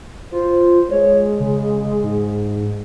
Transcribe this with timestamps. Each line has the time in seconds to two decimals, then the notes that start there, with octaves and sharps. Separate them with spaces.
0.32 F4 C5
0.91 G#3 C#5
1.39 C#3
2.03 G#2